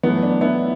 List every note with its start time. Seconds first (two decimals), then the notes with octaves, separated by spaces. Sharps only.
0.03 F#2 E3 A3 B3
0.23 D4
0.41 B3 E4